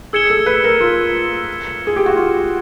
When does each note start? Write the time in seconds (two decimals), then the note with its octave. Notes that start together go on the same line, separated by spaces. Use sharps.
0.13 G#4 E6 G#6 C#7 E7 G7
0.30 A4
0.46 B4
0.64 A#4
0.80 F4
1.87 G#4
1.96 G4
2.06 F#4
2.16 F4